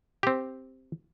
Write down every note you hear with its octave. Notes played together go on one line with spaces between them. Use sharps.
C4 G4